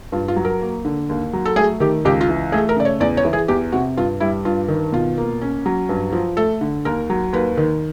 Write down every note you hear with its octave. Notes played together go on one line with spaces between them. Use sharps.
G2 F4
F4
F#3
A#4
A#3
D3
D#2
F#3
A4
A3 G#4
D#3 G4
C#2 G4
F4
E3
A3 G#4
A#4
C#3 D5
C#5
E2 D5
C#5
E3
G#4
E2 G4
C3 F#4
G2 F4
G3 E4
G2 F4
D#3
B2 F4
A#3
C#4
F#3
G2
F3
A3 A4
D3
D#2 A#4
F#3
D#2 B4
D#3